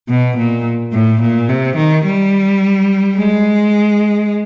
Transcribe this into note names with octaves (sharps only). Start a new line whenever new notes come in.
B2
A#2
A2
A#2
C3
D#3
G3
G#3